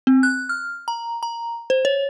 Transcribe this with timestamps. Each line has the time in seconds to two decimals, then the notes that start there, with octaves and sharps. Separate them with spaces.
0.07 C4
0.23 F#6
0.49 F6
0.88 A#5
1.23 A#5
1.70 C5
1.85 C#5